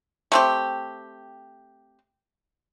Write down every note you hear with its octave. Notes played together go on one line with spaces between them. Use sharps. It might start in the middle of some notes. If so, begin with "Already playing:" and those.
A3 C4 G4